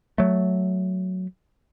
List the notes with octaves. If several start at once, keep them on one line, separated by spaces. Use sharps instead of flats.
F#3 A3